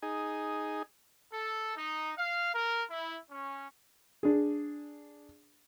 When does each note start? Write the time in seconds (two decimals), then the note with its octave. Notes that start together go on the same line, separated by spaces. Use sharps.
0.02 D#4 G#4
1.32 A4
1.76 D#4
2.15 F5
2.54 A#4
2.89 E4
3.29 C#4
4.23 D4 G#4